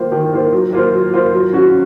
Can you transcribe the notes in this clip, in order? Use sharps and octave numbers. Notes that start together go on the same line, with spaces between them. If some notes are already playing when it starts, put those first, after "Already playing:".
Already playing: D#3 A#3 F4 C5
D#3
A#3 F4 C5
F#3
A#3 F4 C5
F#3
A#3 F4 C5
F#3
C#4 F#4